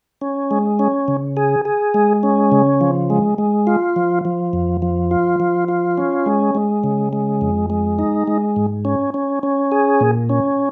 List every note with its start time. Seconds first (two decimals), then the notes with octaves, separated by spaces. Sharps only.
0.21 C#4
0.51 G#3
0.79 C#4
1.08 C#3
1.37 G#4
1.65 G#4
1.94 G#3
2.23 C#4
2.52 C#3
2.81 F3
3.10 G#3
3.38 G#3
3.67 F4
3.96 F3
4.25 F3
4.53 F2
4.82 F3
5.11 F4
5.40 F3
5.68 F4
5.98 C#4
6.26 G#3
6.55 G#3
6.84 C#3
7.13 G#3
7.41 F2
7.70 G#3
7.99 D#4
8.27 G#3
8.56 G#2
8.85 C#4
9.14 C#4
9.43 C#4
9.72 G#4
10.01 A#2
10.29 C#4